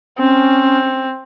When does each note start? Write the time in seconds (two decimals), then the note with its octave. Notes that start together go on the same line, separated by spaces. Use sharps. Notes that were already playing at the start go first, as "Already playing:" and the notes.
0.19 C4 C#4